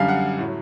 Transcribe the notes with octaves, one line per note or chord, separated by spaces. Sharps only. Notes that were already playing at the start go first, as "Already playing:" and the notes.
Already playing: F#2 D3 G3 F5
F#5
A2 F#3